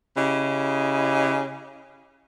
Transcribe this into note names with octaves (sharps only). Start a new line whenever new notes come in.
C#3 E4 G4 D#5